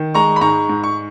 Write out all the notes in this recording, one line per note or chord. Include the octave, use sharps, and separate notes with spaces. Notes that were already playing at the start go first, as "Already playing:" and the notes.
Already playing: D#3
G#3 A#5 C#6
B5
G#2 A#5 C#6
G#2
C#6